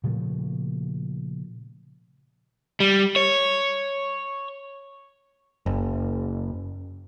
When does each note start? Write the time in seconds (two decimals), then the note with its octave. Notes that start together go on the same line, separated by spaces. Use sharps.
0.04 A#2 C#3 F3 A3
2.80 G3
3.16 C#5
5.66 F#1